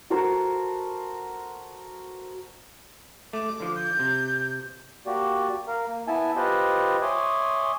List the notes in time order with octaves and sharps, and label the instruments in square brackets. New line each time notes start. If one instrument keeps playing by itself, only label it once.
[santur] F#4 A4 A#4 C5
[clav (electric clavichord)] A3 [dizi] D6
[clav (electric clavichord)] D3 F3
[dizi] G6
[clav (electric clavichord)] C3
[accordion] A#3 F#4 G4 D5
A#4 F5
A#3
B3 E4 E5 G#5 A5
F4 G4 B4 C5 D#5
C#5 E5 G#5 C6 D6 D#6